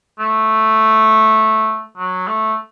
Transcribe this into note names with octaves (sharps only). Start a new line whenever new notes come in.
A3
F#3
A3